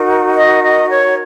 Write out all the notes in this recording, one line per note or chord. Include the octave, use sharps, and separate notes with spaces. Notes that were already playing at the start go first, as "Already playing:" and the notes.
Already playing: D#4 F#4 A#4
D#5
D#5
C#5